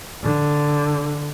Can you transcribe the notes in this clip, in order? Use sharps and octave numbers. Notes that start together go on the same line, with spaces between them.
D3